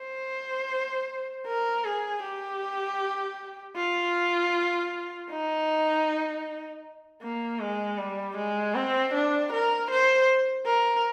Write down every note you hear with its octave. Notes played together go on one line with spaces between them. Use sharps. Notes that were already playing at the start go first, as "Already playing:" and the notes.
Already playing: C5
A#4
G#4
G4
F4
D#4
A#3
G#3
G3
G#3
C4
D4
A#4
C5
A#4